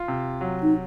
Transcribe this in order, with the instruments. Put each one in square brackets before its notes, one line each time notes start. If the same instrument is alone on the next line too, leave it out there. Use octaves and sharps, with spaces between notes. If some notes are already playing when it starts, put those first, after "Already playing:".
Already playing: [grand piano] F4
C3
F#3
[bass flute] D#4